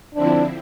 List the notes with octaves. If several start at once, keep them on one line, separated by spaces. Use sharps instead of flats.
D3 F3 C4 D4 E4